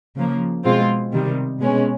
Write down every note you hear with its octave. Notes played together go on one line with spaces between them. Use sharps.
C#3 F3 A#3
B2 G#3 C4 F4
C3 D#3 G3
B2 G#3 C#4